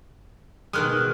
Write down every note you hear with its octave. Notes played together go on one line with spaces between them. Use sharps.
B2 D#3 G#3 D#6 F6 F#6